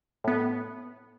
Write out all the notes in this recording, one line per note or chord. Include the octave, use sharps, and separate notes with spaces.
A2 B3